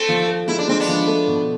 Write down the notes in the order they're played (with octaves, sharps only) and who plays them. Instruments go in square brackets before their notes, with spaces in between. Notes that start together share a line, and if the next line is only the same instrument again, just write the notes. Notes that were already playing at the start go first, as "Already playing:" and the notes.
Already playing: [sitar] A3 C4 [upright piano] A4
[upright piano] F3
A4
[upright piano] G#3 [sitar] E4
[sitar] D4
[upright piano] G#3 [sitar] C4
[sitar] B3 D4
[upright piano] F3
A3
B2